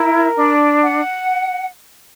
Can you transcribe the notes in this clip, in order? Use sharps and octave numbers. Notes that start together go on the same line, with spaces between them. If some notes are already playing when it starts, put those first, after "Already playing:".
Already playing: E4 A#4
D4
F#5